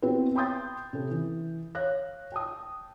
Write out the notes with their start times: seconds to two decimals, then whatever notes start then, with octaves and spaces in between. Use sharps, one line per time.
0.02 B3 C4 E4 F#4 B4
0.35 G5 B5 C6 D#6 G6 A6
0.93 C3 C#4 A4
1.11 E3
1.75 C#5 F5 F#6 A#6
2.32 G5 A5 D#6